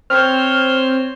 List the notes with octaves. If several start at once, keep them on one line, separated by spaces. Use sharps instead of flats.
C4 C5 C#5 F6